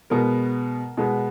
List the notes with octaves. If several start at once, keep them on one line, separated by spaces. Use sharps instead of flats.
B2 G#3 B3 A#4
B2 G#3 B3